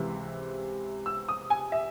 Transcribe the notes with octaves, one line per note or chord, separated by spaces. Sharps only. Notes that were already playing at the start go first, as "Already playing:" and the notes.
Already playing: C#2 C3 E3
E6
D#6
G#5
E5